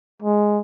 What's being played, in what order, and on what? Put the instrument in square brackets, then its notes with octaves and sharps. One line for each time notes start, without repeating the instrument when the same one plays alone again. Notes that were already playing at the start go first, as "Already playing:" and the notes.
[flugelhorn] G#3